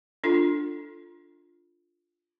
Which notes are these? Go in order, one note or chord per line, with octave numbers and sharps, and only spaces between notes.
D4 F4 A4